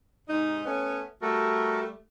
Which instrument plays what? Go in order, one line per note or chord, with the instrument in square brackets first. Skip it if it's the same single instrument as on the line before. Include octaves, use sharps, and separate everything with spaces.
[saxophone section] G#2 C3 D#4
A3 B3 C#4
[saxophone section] G3 A3 [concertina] F#4 A4 A#4